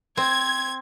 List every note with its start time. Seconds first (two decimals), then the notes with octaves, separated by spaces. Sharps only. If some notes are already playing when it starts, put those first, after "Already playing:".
0.17 C4 G#6